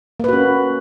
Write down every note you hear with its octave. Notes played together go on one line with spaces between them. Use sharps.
A#3 C#4 F#4 B4